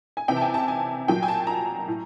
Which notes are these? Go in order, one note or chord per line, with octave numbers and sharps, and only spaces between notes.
G#5
C3 E3 G5
A5
G#5
A5
G#5
A#2 F#3 G5
G#5
A5
A#5
A2